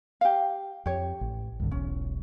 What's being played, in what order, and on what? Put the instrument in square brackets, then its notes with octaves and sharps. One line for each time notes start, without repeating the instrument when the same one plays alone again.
[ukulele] G4 F5
[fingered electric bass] F2 [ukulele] G4 C#5
[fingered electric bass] A1
C2 G2 D3
[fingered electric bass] E1 B1 E2 [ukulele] C#4